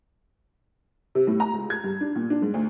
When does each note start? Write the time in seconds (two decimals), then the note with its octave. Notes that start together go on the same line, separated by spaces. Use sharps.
1.15 C3
1.27 A2
1.40 A#5
1.53 C#2
1.70 G#6
1.84 G2
2.01 D4
2.15 A#2
2.30 D4
2.42 G#2
2.54 D2